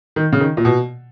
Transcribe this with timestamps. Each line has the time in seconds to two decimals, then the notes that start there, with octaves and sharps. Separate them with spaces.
0.16 D#3
0.33 C#3
0.40 D#3
0.57 A#2
0.65 B2